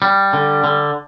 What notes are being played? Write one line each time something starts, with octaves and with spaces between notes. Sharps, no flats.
G3
D3
D3